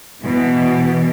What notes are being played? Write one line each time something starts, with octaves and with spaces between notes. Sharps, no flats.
B2 E3